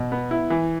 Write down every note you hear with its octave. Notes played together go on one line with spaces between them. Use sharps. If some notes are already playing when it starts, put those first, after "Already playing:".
Already playing: B2
B3
E4
E3